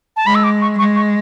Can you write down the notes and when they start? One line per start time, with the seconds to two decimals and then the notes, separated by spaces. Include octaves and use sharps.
0.16 A5
0.26 G#3 B5
0.35 E6
0.44 D6
0.61 C#6
0.79 G#3 C#6
0.96 C#6